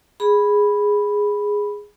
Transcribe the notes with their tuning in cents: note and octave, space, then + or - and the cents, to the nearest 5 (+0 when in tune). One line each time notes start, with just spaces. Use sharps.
G#4 -5 B5 +0